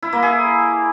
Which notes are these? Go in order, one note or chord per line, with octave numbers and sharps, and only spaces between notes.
E4
A#3
G#4